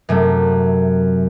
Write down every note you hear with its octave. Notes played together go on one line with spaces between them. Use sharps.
F#2 C3 A3